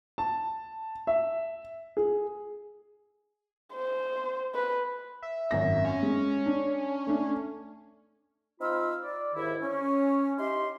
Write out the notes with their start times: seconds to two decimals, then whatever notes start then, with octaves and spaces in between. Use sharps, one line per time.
0.18 A5
1.07 E5
1.97 G#4
3.73 C5
4.54 B4
5.22 E5
5.51 G#1 F#2 A#6
5.85 C#4
6.03 G#3
6.46 D4
7.07 A3 D4
8.60 C4 D#4 F4 F5 B5 E6
9.03 D5
9.35 D#2 G#2 D#3 E4
9.61 C#4
10.38 D#4 E4 G4 C6